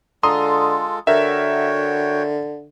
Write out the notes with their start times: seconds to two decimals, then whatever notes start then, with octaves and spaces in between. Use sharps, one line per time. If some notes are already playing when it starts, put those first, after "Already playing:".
0.23 D3 G#3 F4 A4 A#5 C6 D#6
1.07 D3 F#4 A#4 C#5 E5 G5